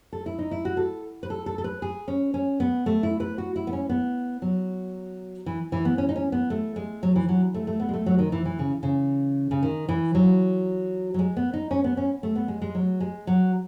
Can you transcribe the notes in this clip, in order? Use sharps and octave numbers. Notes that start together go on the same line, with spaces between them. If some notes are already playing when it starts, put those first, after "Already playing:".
A4
E4
D#4
E4
F#4
A4
B4
A4
A4
A4
B4
G#4
C#4
C#4
B3
A3
E4
B4
F#4
E4
B3
C#4
B3
F#3
E3
E3
B3
C#4
D#4
C#4
B3
A3
G#3
F#3
E3
F#3
A3
A3
B3
G#3
A3
F#3
D#3
E3
E3
C#3
C#3
C#3
D#3
E3
F#3
F#3
G#3
B3
D#4
C#4
B3
C#4
A3
B3
G#3
G#3
F#3
G#3
F#3